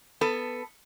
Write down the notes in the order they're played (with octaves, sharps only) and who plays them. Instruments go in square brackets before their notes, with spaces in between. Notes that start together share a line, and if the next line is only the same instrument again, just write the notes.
[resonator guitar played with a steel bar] B3 A4